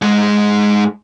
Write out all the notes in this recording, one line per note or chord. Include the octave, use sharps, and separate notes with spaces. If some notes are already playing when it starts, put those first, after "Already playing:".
G#2 G#3